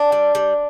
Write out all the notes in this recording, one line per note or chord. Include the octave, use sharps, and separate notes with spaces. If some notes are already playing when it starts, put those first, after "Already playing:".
Already playing: D4
G3
G3